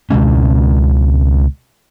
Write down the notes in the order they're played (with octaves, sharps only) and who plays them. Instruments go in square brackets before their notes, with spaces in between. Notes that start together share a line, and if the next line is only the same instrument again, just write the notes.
[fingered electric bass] C#2 B2 G#3 C#4